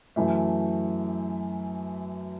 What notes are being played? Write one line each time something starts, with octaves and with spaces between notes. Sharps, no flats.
F#2 E3 A3